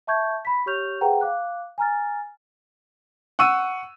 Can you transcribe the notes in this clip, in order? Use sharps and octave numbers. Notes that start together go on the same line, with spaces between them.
E5 A5 C#6 G6 G#6
B5 B6
G4 C#5 C#6 F6 G6 F7
G#4 B4 C5 F#5 G5 A#5
F5 D6 F#6
G#5 A#5 F6 A6
F#5 C#6 E6 D#7